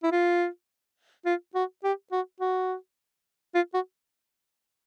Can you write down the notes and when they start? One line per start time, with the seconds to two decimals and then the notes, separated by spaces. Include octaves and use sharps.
0.03 E4
0.12 F4
1.26 F4
1.55 F#4
1.84 G4
2.12 F#4
2.40 F#4
3.55 F4
3.74 F#4